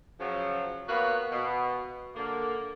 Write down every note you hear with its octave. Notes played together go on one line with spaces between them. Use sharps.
C#3 F3 F#3
A#3 B3 F4 F#4 B4 C#5
B2
D3 A#3